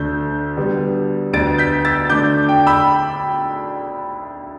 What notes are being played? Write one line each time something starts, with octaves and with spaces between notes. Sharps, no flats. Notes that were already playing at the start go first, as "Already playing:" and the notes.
Already playing: D2 D3 A3 D4 G6
D3 G3 B3
D2 D3 B3 D4 A6 D7
G6 B6
E6 A6
D3 A3 D4 D6 G6
G5
B5 E6